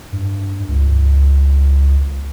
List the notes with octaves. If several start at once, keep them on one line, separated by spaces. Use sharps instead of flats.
G2
C#2